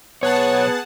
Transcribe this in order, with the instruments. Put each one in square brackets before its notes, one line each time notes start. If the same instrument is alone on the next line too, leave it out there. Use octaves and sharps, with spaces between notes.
[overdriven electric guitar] B1 C#5 [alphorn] B3 [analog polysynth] G#4 F#5 A5